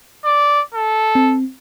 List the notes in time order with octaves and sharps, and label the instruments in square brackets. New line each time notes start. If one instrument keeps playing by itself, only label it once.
[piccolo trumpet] D5
A4
[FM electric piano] C4